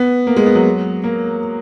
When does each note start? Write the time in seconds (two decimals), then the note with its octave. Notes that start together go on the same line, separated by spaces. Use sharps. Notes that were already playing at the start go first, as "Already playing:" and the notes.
Already playing: B3
0.27 A#3
0.36 G#3
0.46 B3
0.55 F#3
1.04 A#3